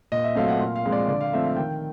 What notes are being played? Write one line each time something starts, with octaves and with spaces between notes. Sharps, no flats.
A#2 D#5
E5
F#3 A3 C4 F5
F#5
A#2 F5
F5
F3 G#3 C4
D5
D3 D5
F5
F3 A3 C4 E5
F5
D#3 G5